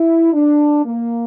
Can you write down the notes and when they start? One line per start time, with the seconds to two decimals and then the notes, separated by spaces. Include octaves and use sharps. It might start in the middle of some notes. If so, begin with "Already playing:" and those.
Already playing: E4
0.34 D4
0.85 A#3